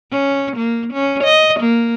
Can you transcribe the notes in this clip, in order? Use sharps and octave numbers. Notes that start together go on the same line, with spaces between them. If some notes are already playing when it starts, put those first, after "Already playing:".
C#4
A#3
C#4
D#5
A#3